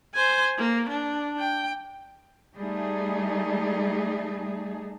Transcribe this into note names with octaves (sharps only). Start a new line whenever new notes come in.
C5 G#5
A#3
D4
G5
G3 A3 D#4 G#4